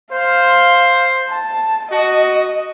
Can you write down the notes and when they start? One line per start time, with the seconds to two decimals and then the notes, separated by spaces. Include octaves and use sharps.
0.12 C5 F5
1.29 A5
1.91 F#4 D#5